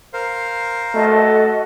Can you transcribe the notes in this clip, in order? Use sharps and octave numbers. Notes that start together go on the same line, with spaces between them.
A#4 C5 F5
A3 F#4 A4 D#5